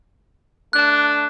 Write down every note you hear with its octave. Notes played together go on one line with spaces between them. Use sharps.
A3 D4 F#6